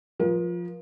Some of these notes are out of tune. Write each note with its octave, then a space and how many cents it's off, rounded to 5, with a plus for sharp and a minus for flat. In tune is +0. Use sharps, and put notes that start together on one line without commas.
F3 +5 A#4 +45